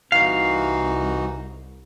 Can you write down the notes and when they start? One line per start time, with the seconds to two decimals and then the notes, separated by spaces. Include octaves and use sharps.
0.12 C2 E3 D#4 F#4 F5